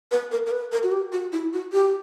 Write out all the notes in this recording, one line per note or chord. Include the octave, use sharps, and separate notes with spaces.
B4
A#4
A#4
B4
A#4
F#4
G4
F#4
E4
F#4
G4